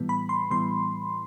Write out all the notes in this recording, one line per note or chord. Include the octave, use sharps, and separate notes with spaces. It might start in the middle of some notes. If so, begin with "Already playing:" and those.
Already playing: A2 E3 G3 B3
B5
C6
A2 E3 G3 B3 C6